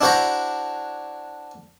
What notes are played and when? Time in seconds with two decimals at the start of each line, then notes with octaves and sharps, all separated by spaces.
0.01 D4 E4 F#4 C5 F#5 A#5